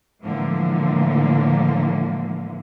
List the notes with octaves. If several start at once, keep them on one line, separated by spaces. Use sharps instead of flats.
A2 D3 E3 F3 G#3 A#3